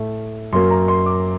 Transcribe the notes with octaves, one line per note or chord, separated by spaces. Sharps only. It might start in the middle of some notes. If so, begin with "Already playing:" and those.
Already playing: A2 A3
F#2 F#3 A#3 C6
A#5
C6
D6